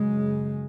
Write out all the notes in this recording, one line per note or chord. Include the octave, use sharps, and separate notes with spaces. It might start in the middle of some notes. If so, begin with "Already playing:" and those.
Already playing: F#2 C#3 G#3